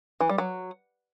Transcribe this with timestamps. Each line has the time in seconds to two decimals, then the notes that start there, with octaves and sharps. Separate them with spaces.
0.21 E3
0.29 G3
0.38 F#3